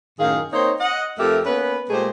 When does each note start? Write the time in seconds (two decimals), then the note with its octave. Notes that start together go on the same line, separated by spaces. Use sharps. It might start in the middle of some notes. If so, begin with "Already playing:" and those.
0.20 F#2 A2 D#3 G#4 F5
0.52 A#3 C4 D#4 C5 C#5
0.80 D#5 F#5
1.18 F2 A3 G4 A#4 E5
1.46 A#3 B3 C#4 B4
1.90 A#2 G#3 A3 G4 G#4 C5